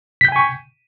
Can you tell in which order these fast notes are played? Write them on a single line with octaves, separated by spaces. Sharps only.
B6 G6 G5 G#5 C#6